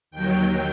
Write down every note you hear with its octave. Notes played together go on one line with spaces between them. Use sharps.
D#2 D#3 F#3 G5